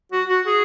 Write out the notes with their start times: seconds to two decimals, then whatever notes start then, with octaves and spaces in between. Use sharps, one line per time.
0.12 F#4
0.29 F#4
0.46 G#4